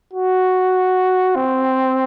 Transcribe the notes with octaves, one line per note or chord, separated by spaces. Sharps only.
F#4
C4